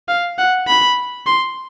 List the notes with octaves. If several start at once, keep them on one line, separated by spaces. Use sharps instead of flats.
F5
F#5
B5
C6